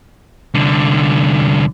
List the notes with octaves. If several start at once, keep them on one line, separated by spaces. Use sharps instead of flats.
C2 D3